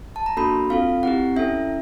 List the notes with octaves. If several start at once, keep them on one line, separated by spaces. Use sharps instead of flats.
A5
A#5
A#3 D4 F#4 A4 B5
C4 F4 A4 F5
C4 E4 G4 F#5
C#4 E4 A4 E5